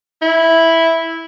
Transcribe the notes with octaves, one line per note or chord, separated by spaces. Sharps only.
E4